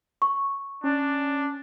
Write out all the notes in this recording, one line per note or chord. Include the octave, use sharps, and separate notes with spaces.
C#6
C#4 D4